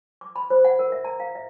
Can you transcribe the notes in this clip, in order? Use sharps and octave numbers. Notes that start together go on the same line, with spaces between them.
D6
B5
C5
F#5
A#4
E5
A#5
F5
E5